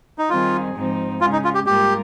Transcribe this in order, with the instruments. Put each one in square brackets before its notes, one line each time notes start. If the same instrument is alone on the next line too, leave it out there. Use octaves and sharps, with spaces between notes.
[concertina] D#4
[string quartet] D#3 G3 C4 D#4 G#4 [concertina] F4
[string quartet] G#2 F3 C4 D#4
[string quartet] C#3 G#3 C#4 G#4 [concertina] F4
[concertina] D#4
F4
G4
[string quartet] G#2 G3 A#3 F4 A#4 [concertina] G4